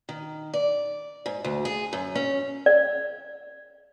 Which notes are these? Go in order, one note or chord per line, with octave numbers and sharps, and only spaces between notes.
D#3
D5
G#2
D2
G#4
F#2
C#4
D5